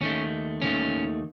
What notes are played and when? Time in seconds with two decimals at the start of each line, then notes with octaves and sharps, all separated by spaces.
0.01 D#2 D#3 A3 C#4
0.62 D#2 D#3 A3 C#4